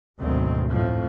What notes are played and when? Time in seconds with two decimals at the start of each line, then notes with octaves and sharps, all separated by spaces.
0.19 G#1 D2 B2 D#3 F#3 C4
0.72 F2 A2 F3